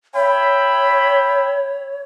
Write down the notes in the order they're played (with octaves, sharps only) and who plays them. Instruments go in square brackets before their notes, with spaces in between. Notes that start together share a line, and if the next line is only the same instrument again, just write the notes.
[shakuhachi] C#5 [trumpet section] E5 G5 B5